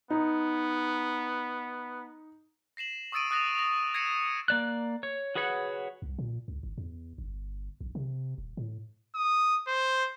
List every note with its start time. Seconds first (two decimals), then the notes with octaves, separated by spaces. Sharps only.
0.10 B3 D#4
2.77 A#6 C7 E7 F#7
3.12 C#6 D#6 E6 A6 D7 D#7
3.31 D#6 F#6 A6 A#6 E7 F7
3.55 A#6 F7
3.94 G#6 A#6 C7 C#7 D#7 E7
4.48 A#3 D5 F#6
5.03 C#5
5.35 F#4 G#4 B4 C#5 F#5
6.02 C2
6.19 A#2
6.48 C#2
6.63 G#1
6.78 E2
7.18 G1
7.81 A#1
7.95 C3
8.38 D#1
8.57 A2
9.15 D#6
9.67 C5